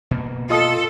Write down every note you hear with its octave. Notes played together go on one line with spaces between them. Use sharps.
B2 A#3
F4 A4 D#5 D#6